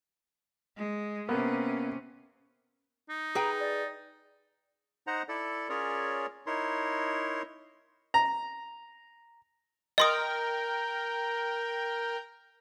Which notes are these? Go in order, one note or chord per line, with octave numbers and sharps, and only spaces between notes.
G#3
C3 A#3 B3 C#4
D#4
G#4 B4 G5 A#5
D5
D#4 C5 D#5 F#5 A#5
E4 A4 D5
C#4 F4 G#4 A#4 C#5 D5
D#4 E4 A#4 C#5 C6
A#5
A#4 D#5 G5 C6 D#6